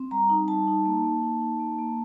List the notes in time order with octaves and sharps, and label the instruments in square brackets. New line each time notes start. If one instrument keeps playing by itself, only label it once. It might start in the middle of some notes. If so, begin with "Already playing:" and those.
Already playing: [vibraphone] C4
G3 A#5
D#4
G3 A5
D#4
A#3
A#3
D#4
D#4
A#3
A#3